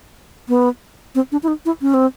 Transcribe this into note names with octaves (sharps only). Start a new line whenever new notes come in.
B3
C4
D4
E4
D#4
E4
C#4
C4